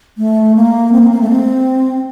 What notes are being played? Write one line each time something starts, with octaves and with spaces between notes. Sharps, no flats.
A3
A#3
C4
A#3
A#3
A3
C4